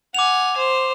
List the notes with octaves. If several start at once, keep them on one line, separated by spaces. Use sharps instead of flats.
F#5 G#5 D6 F7
C5